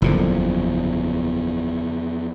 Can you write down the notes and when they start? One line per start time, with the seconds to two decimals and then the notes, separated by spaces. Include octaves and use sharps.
0.02 F#1 E2 A#2 D3 F3